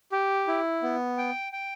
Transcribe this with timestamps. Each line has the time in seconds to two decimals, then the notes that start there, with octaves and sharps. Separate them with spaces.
0.12 G4
0.48 E4
0.83 B3
1.18 G5
1.53 G5